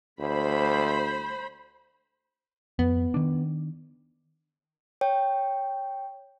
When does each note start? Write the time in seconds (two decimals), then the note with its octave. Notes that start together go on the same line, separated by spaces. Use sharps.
0.20 D2 C5 B5
2.79 F2 B3
3.14 D#3 D4
5.01 C#5 G5